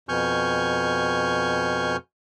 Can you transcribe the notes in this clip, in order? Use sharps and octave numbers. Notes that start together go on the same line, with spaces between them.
F2 B2 G#5 C#6 F6 G6